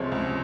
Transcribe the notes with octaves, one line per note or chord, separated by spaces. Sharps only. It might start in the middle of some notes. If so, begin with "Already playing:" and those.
Already playing: C#2 C3 F3 G#3 C#5
C#2